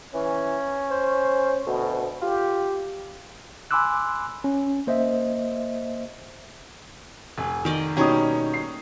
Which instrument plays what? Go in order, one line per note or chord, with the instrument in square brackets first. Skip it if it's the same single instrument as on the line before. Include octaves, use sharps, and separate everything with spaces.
[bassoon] E3 [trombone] C#4
[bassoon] C5
[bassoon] D2 [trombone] B2
[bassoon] F4 [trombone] G4
[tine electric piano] G#5 B5 C6 D6 E6 F#6
C#4
A#3 C5 D#5 E5
[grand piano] F1 [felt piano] G#5
[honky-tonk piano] D#3 [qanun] A#4 D5 D#5
[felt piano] B2 D#4 D#6 [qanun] G3 A#3 G#4 [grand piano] C#4 C#5
[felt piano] C7